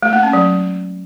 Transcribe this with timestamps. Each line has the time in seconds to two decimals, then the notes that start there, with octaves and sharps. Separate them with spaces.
0.03 A3
0.13 A#3
0.23 C#4
0.33 F#3